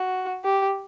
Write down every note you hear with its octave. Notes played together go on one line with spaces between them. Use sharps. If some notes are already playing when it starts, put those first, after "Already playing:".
Already playing: F#4
G4